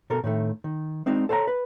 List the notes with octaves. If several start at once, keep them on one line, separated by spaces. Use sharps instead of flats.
B2 A4 A#4
A2 D#3 A3
D#3
G#3 C4 D4 D#4
A4 C5 C#5 F#5 A#5
B4